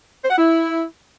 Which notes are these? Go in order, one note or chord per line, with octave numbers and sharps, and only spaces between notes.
C5
F#5
E4